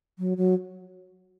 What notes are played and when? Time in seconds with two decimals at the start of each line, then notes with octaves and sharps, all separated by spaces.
0.19 F#3
0.37 F#3